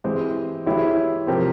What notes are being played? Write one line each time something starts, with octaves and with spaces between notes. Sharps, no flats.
E3 G#3 C4 G4
E3 G#3 E4 G4 C#5
C3 F3 C4 G4 A#4